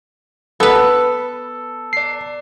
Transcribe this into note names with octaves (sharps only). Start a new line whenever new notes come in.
B3 A4 B4
D5 C7